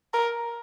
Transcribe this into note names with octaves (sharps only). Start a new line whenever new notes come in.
A#4